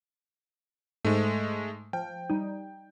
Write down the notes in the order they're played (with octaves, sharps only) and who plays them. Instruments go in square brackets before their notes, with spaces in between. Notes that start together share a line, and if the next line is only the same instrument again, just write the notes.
[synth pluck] G#2 [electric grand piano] G#3 A3
[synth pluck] F3 [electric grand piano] G5
[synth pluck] G3 D#4